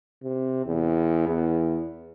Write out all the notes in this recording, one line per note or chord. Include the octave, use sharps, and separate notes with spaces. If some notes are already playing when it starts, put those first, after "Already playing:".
C3
E2
E2